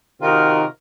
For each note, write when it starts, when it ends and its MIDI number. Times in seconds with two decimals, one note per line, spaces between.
0.21 0.64 48
0.21 0.64 51
0.21 0.64 63
0.21 0.64 65
0.21 0.64 66
0.21 0.64 70